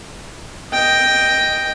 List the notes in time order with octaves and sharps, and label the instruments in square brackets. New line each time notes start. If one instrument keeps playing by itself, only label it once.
[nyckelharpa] D#5 G5